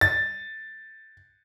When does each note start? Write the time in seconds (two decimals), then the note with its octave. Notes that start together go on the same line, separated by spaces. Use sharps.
0.01 A6